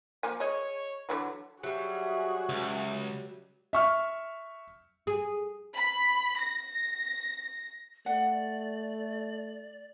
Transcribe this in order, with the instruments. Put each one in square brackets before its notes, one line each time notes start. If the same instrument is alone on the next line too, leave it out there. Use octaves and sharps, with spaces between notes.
[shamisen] F3 A#3 G#5
[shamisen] G#4 D#5 [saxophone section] C#5
[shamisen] D3 E3 F#3
[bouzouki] F#3 G3 [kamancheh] F#4 G#4 [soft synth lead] E5
[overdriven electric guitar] C#2
[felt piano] E5 C#6 F6
[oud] G#4
[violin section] B5
A#6
[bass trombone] A3 [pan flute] D5 [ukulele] F#5